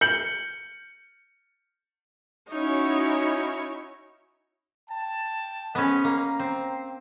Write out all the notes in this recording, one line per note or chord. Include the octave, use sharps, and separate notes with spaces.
G6 C#7 F#7
C#4 D#4 E4 F#4 C#5
G5 A5
B3 C#4 G#4 C5 D#5
A#3 A#5
C4